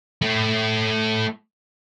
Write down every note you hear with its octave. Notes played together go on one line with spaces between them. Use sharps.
A3 E4